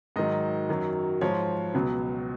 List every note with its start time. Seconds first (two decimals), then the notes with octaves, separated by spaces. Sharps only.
0.16 G#2 D#3 F#3 D#5
0.69 F#2 D#3 F#3
1.21 G#2 F3 C#5
1.74 C#2 B2 F#3